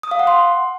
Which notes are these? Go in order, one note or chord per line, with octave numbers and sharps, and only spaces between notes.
D#6
F5
F#5
C6